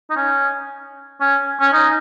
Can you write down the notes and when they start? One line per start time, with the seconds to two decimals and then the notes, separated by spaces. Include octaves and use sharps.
0.10 D#4
0.16 C#4
1.20 C#4
1.60 C#4
1.73 D#4